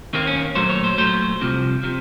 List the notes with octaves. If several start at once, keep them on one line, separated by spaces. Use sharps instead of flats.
D#2 D#3 A#3 C4
C#4
A#2 F#3 A3 C5
C#5
C5
A#2 F#3 A3 C5
C2 C3 F3
C3 F3